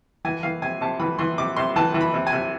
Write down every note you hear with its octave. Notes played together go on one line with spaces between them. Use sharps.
E3 G#5
E3 F5
C3 G#5
C3 A5
E3 B5
E3 C6
C3 D6
C3 C6
E3 A5
E3
B5
C3
G#5
C3